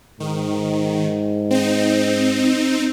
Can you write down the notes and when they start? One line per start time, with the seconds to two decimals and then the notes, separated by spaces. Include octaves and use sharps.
0.20 G#2 D#3
1.50 C4 D#4